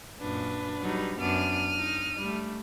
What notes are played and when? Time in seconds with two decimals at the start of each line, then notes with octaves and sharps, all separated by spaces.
0.20 F#2 A#2 D4 B4
0.81 F#3 G3 D#4
1.19 F#2 B3 D4 F6 D#7
1.76 D#4
2.19 G3 A3